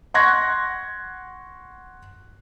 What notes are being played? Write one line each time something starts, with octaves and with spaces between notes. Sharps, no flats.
F#5 C6 C#6 F#6 G#6 A#6